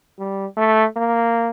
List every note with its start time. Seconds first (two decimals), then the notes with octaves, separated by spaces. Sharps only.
0.19 G3
0.57 A3
0.97 A#3